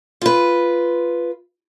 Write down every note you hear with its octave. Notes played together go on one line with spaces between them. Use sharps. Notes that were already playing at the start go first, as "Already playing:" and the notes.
F4 B4